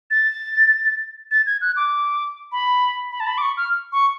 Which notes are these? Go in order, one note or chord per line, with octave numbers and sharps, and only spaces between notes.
A6
A6
G#6
F#6
D6
B5
B5
A5
B5
D6
C#6
F6
C#6